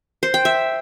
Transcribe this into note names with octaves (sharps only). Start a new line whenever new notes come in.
C5
G5
E5